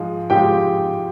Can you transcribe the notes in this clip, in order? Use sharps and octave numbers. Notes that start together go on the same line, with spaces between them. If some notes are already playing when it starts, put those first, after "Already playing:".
Already playing: G#2 F3 G#3
G#2 F3 G#3 G4 G5